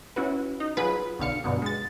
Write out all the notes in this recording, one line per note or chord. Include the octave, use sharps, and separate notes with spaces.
C#4 E4 F#4 B4
D#4
F#3 F4 G#4 B4
B1 D3 F5 C#7
G2 B2 D3 F#3
G#3 A6